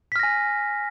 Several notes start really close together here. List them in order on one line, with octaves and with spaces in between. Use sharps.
B6 F6 A#6 G#5